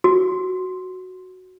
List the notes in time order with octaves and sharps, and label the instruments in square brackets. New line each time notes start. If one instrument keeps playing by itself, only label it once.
[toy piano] F#4